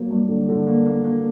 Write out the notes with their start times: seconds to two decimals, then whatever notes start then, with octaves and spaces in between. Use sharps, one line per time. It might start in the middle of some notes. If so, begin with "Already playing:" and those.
Already playing: F#3 A#3
0.11 G2
0.29 D3
0.49 D3
0.67 A#3
0.86 A#3
1.04 A#3